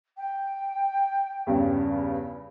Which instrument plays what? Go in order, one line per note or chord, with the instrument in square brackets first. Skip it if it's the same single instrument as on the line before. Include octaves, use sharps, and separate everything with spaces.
[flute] G5
[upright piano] E2 G2 C#3